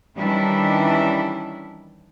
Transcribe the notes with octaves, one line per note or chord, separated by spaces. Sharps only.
D#3 E3 G3 C#4 D4 E4